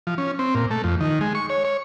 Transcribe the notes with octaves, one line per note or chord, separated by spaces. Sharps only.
F3
C#4
C4
A#2
A3
F2
D#3
G#3
C#6
C#5
C#5